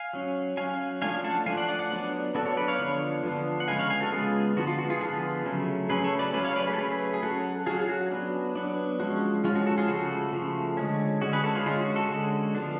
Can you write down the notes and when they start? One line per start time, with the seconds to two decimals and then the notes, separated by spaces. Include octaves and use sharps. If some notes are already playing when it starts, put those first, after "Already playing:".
Already playing: F5 G#5
0.13 F#3 C#4
0.57 F#3 C#4 F5 G#5
1.02 F3 A3 D4 F5 G#5
1.24 F#5 A5
1.46 F3 A3 D4 F5 G#5
1.57 D5 F#5
1.69 D5 F#5
1.79 D5 F#5
1.90 F#3 B3 D4
2.35 F#3 B3 D4 F#4 A4
2.45 A4 C#5
2.57 B4 D5
2.68 C#5 F5
2.79 D3 F3 B3 D4
3.24 D3 F3 B3 D4
3.60 F#5
3.68 C#3 G#3 B3 F5 G#5
3.79 C#5 F5
3.90 F5 G#5
4.01 F#4 A4
4.12 C#3 G#3 B3 F4 G#4
4.56 D3 F3 B3 F#4
4.67 F4
4.79 F#4
4.90 F4 G#4
5.01 D3 F3 B3 F4 G#4
5.46 C#3 F#3 A3 C#4
5.89 C#3 F#3 A3 C#4 G#4 B4
6.04 A4 C#5
6.19 B4 D5
6.33 F#3 A3 C#4 G#4 B4
6.45 C#5 F5
6.56 B4 D5
6.67 G#4 B4
6.73 A4
6.78 F#3 A3 C#4 G#4 B4
7.13 G#4
7.23 F#3 C#4 F#4 A4
7.66 F#3 C#4 F4 G#4
7.80 G#4
7.89 F#4
8.11 F#3 B3 D4
8.55 F#3 B3 D4
9.00 F3 G#3 C#4 F#4
9.44 F3 G#3 C#4 F4
9.55 F#4
9.66 F#4 A4
9.78 F4 G#4
9.88 C#3 F3 A3 F#4 A4
10.33 C#3 F3 A3
10.77 D3 G#3 C#4
11.21 D3 G#3 C#4 F#4
11.33 G#4 B4
11.44 F#4 A4
11.55 F4 G#4
11.66 D3 G#3 C#4 F4
11.81 F#4
11.96 F#4 A4
12.10 D3 G#3 C#4
12.55 F3 B3 D4